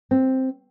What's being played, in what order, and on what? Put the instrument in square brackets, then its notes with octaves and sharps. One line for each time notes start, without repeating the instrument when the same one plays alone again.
[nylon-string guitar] C4